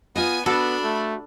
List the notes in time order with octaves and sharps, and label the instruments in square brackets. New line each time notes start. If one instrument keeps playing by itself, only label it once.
[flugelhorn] B3 [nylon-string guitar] F4 D#5 [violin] G#5 D#7
[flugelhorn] B3 [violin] D4 B5 [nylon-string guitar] F#4 [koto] A4
[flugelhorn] A3